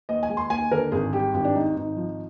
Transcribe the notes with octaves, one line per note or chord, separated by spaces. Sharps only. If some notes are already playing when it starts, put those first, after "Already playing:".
D#2 D#5
G#5
G#3
C6
D#2 G#5
D3 A#4
G#1 G#4
G3 G4
G#1 G4
D4
G#2 D#4
G#1 D#4
F3